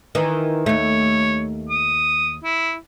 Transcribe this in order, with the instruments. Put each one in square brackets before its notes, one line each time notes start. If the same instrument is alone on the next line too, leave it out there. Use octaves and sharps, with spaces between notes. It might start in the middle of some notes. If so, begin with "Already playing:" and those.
[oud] D#3 E3
[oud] D#2 A3 [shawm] C#5
[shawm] D#6
E4